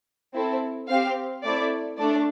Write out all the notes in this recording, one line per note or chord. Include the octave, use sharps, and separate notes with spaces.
C4 E4 A4
C4 G4 F5
A3 C4 E4 D5
A3 D4 D5